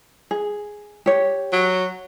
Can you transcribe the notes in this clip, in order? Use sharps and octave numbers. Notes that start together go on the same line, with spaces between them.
G#4
G4 C#5
F#3